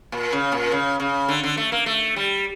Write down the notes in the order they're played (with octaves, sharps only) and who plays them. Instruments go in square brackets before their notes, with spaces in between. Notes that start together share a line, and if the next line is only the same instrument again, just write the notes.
[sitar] A#2
C#3
A#2
C#3
C#3
D3
D3
A3
A#3
A3
G3